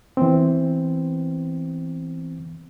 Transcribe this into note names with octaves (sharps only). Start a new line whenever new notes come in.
E3 B3 C4